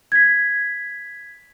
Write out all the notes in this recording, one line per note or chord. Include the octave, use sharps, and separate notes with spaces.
G#6 B6